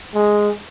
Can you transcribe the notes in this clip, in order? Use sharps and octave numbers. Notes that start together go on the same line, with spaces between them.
G#3